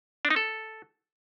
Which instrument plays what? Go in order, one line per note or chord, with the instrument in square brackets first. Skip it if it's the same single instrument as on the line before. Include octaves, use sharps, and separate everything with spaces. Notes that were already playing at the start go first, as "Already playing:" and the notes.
[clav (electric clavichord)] D4
D#4
A4